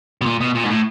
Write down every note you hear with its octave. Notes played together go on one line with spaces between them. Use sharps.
B2
A#2
B2
A#2
G#2
A2